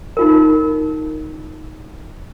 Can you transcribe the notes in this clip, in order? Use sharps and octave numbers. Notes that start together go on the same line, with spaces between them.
D#4 F4 A#4